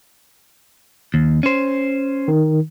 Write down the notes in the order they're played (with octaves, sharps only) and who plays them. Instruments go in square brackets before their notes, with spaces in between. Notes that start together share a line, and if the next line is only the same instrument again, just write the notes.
[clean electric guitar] D#2
C#4 C5
[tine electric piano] D#3